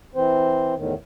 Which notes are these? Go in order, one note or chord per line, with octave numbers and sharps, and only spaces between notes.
E3 C4 C5
E2 A2 D#3